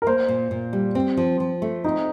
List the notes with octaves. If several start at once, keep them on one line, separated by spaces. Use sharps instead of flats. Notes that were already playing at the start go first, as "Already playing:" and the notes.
A#4
A#3 C5
A#2
A#2
G3
C4
F3
F3
A3
C4 D#4